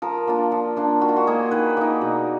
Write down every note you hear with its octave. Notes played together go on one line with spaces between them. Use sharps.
F3 A#4
A#3 D4 F4
F3
A#3 D4 F4
D#3 F#4
F4
F#4
A#3 D#4 G#4
D#3 B4
A#3 D#4 D5
B2